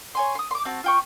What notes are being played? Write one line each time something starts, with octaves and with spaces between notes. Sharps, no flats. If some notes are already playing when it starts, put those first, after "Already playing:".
C#5 G#5 C6
C6 D#6
C6 D6
C4 F#4 A5
F4 G5 C#6